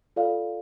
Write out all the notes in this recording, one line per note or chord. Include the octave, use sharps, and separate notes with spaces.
F4 A4 D5 F5